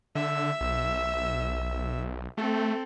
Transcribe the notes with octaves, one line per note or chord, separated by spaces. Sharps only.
D3 E5 E6
B1
A3 C4 A4